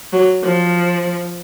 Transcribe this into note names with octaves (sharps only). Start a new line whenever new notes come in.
F#3
F3